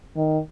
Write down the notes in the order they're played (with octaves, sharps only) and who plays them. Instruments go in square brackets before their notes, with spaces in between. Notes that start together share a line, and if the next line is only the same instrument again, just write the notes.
[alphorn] D#3